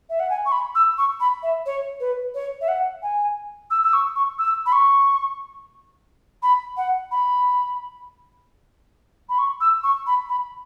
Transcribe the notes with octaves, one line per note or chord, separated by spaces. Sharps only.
E5
F#5
G#5
C#6
B5
E6
C#6
B5
E5
C#5
B4
C#5
E5
F#5
G#5
E6
E6
C#6
C#6
E6
B5
C#6
B5
F#5
B5
B5
C#6
E6
C#6
B5
B5